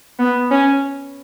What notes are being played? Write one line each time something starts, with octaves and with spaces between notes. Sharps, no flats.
B3
C#4